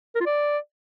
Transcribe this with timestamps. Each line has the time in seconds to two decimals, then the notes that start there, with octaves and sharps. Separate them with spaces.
0.15 A#4
0.20 F4
0.26 D5